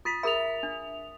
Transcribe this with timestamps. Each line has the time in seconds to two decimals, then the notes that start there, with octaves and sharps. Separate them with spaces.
0.05 F4 D#6 A6 B6
0.23 G#4 A#4 E5 B5 D#6 F7
0.63 D4